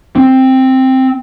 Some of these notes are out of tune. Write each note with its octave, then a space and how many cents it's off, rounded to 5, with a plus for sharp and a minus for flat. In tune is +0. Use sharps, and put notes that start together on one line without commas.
C4 +5